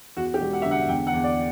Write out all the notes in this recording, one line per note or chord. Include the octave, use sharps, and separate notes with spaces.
E2 F#4
G4
E1
F#5
D3 E5
F#5
E2 G5
F#5
E2
D5